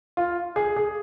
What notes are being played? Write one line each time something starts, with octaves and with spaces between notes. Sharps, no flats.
F4
G#4
G#4